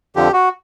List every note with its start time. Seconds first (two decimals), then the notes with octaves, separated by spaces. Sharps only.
0.16 F2 D3 F3 G4
0.33 F#4